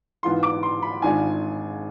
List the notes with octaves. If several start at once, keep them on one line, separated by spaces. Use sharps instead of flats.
G#2 E3 B3 F4 C6
D6
C6
B5
G#1 G#2 G#3 D4 F4 G#5